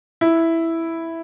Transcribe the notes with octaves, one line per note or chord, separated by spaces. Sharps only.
E4